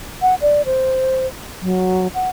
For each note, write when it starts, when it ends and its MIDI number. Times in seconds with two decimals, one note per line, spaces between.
0.22 0.35 78
0.42 0.62 74
0.66 1.27 72
1.62 2.08 54
2.14 2.29 78